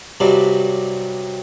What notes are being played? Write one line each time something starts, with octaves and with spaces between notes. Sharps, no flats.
G2 C3 F#3 G3 D4